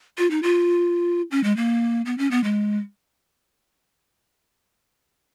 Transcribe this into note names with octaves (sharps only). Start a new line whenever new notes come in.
F4
D#4
F4
C#4
G#3
A#3
B3
C#4
B3
G#3